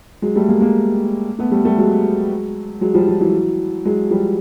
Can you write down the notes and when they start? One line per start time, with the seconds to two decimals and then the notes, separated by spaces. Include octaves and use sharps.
0.22 F#3 G#3
0.36 G3 A3
0.49 G#3 A#3
0.61 G#3 A#3
1.39 A3 B3
1.52 G3 A3
1.65 G3 A3
1.78 F#3 G#3
2.81 F#3 G#3
2.94 F3 G3
3.08 F3
3.21 E3 F#3
3.85 F#3 G#3
4.11 F3 G3